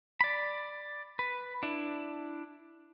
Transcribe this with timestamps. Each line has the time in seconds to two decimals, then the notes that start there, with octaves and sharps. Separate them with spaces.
0.21 D5 B5
1.19 B4
1.63 D4 E4